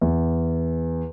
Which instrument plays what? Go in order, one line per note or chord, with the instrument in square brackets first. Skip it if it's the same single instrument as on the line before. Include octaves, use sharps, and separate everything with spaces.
[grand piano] E2